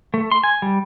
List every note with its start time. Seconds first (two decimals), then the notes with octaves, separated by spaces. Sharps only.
0.14 A3
0.31 C6
0.44 G#5
0.62 G3